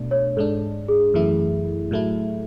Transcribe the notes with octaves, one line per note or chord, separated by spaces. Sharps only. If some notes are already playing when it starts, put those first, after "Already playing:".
Already playing: B2 A3 D4
C#5
G#2 G#3 D4 A4
G#4
F#2 E3 A3 E4
A2 F#3 A3 E4